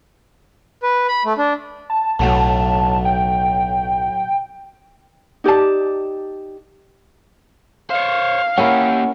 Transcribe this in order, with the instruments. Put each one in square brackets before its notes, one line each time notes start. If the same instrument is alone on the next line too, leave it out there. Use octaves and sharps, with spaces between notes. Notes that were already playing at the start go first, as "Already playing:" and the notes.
[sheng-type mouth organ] B4
B5
A3
D4
[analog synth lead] A5
[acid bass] B1 [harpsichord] A2 F#3 A3 [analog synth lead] A5
[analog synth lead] G5
[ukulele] D#4 G4 D5 A5
[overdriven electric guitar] C5 C#5 [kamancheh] F5
[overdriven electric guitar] A#3 G4 [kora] C#4 E4 A#4 [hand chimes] F#5